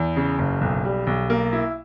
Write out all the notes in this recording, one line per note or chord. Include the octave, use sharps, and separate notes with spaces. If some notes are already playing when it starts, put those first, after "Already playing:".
Already playing: E2
C#3
F#1
B1
G3
B1
A#3
E4